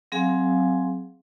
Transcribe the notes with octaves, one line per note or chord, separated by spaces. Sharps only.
F#3 C4 G#4 F5 G#5